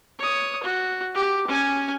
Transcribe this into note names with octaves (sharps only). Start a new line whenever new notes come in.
C#5 D#6
F#4
G4
C#4 G#5